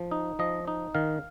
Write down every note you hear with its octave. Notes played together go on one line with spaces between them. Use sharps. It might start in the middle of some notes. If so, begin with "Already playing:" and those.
Already playing: F3
D#4
F3 D#5
D#4
D#3 F5